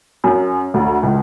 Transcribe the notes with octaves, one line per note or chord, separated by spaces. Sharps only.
F#2
D2
C#2